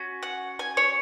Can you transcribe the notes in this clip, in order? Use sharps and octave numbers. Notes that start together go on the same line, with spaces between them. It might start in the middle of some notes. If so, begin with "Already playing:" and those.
Already playing: C#4 F#4
F#5
G#5
C#5